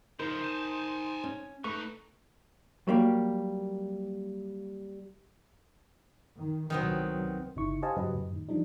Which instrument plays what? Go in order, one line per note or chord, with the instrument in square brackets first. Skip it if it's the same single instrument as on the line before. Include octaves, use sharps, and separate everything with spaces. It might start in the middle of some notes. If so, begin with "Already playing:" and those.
[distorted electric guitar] C#3 F3 [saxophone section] D#4 [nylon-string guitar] A#4 [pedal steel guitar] C5
[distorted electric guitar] G#5 A5
[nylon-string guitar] C#4
[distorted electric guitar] B1 D#4 [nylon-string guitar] A3 [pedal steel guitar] B4 C#6
[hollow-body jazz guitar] F#3 G3 A#3
[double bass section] D#3
[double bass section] C2 F#3 [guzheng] D#3 B3 C4
[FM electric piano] G1 C#3 D#4 E4 C#6
G4 C5 D#5 F5 G#5 A5
G2 C#3 F#3 G4 B4 D#5
F#2 A2
D#3
E3 F3 G3 D4 D#4